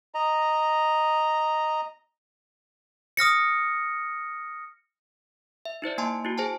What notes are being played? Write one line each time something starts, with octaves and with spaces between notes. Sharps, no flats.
D#5 A#5
D#6 F6 A#6 C#7
E5
D#4 E4 C5 D5
A#3 G#5 A5 C6
E4 F#4
G#4 C5 G#5 A5